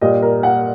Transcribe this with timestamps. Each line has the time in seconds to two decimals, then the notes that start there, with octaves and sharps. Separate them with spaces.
0.01 A#2 G3 D#5
0.22 A#4
0.43 F#5